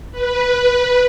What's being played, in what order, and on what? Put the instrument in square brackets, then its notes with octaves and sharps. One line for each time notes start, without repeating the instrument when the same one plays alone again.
[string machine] B4